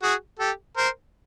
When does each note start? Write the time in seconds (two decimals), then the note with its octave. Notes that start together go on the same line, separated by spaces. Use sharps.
0.02 F#4 G#4
0.39 G4 A4
0.77 A#4 C5